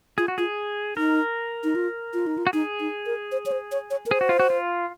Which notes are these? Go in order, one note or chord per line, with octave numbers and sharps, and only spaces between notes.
F4 G#4
F#4
F4 G#4
D#4 A#4
D#4
F4
F4
D#4
F4
F#4
D#4 G#4
D#4
A#4
C5
C#5
C5
C#5
C#5
A#4
G#4 C5
F#4
F4
F#4
F4